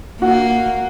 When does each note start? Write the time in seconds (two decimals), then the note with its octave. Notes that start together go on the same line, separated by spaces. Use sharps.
0.22 A#3 F#4